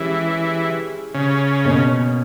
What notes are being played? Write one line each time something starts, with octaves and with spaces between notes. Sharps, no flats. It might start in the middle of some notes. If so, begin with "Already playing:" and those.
Already playing: E3 G#3 C#4 G4
C#3
B2 A#3 C#4